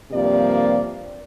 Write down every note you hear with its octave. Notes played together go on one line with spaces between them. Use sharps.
G2 C3 F3 A#3 G4 D5